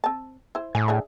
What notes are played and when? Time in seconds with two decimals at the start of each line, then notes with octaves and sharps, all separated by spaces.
0.04 C4 A5
0.55 E4 C5
0.75 A2 G#5
0.88 D4 G#4 E5